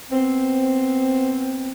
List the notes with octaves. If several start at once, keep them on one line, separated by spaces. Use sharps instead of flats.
B3 C4